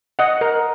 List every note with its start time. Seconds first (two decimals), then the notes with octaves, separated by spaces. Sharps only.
0.19 D#5 F#5
0.41 A#4